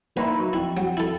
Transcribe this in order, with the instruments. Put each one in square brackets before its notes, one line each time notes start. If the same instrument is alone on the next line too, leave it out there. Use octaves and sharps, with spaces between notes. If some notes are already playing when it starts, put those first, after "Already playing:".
[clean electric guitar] A#3 D#4 E4 [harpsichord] B4
[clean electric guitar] F#3
[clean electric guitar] F2 [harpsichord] E4
[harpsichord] F#3
E4 A4